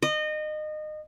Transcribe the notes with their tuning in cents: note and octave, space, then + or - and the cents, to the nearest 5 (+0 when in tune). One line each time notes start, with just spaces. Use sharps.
D#5 -25